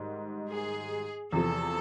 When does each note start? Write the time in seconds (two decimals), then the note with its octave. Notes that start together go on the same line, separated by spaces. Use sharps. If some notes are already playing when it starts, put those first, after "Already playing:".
Already playing: G#2 D#3 G3
0.49 G#4
1.32 E2 C3 F3 A4